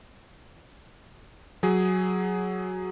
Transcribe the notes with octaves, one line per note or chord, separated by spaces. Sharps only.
F#3 G#4